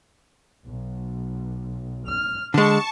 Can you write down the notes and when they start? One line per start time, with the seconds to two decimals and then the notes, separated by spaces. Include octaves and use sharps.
0.67 B1
2.08 F6
2.54 D3 G#3 A5 C#6